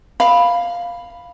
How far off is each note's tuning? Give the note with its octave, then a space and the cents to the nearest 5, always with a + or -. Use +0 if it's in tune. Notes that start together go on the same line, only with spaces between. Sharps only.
F5 +0 B5 +0